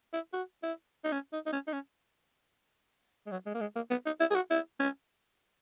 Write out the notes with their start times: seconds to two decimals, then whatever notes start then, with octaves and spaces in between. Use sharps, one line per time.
0.13 E4
0.33 F#4
0.63 E4
1.04 D#4
1.12 C#4
1.33 D#4
1.46 D#4
1.52 C#4
1.67 D#4
1.73 C#4
3.26 G#3
3.31 F#3
3.46 G#3
3.54 A#3
3.61 G#3
3.76 A#3
3.90 B3
4.06 D#4
4.20 E4
4.31 G#4
4.35 F#4
4.51 E4
4.80 C#4